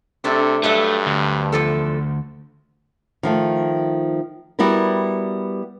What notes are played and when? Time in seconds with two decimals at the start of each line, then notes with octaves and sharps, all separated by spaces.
0.24 C3 A3 D4 A4
0.63 G2 F#3 A3 A4 E5
1.07 D2
1.52 E2 F3 A4
3.23 D#3 F3 A3
4.59 G3 B3 E4 F#4 A#4